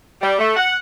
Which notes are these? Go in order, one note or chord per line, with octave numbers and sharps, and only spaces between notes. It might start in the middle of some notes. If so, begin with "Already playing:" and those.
G3
A3
F#5